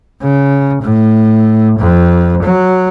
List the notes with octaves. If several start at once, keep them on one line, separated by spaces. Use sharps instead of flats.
C#3
A2
F2
F#3